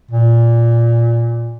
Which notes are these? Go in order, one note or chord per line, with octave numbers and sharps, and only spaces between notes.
A#2